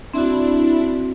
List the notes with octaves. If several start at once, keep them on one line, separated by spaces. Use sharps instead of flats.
C4 D4 E4 F#4